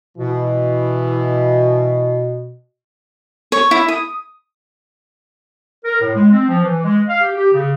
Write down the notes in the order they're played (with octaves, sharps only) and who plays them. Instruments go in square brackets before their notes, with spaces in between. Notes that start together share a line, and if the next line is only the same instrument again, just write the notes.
[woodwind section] B2 [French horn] E3
[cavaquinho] C#5
E4
D#6
[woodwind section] A#4
A2
G#3
C4
F3
E3
G#3
F5
G4
G4
C#3